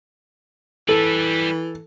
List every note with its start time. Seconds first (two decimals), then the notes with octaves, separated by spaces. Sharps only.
0.89 E3 G3 A4 B4